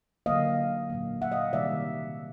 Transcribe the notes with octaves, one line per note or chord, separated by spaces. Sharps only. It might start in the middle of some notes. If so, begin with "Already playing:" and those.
D3 F#3 A#3 D#5 F5
A#2 F#3 A#3
E5 F#5
D#5 F5
C3 D#3 G3 A#3 D5 E5